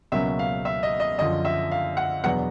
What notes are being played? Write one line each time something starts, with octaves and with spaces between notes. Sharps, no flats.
C#2 B2 F#3 A#3 C#4 E5
F5
E5
D#5
D#5
F#2 D3 F3 D#5
E5
F5
F#5
E2 B2 F#3 B3 D4 F#5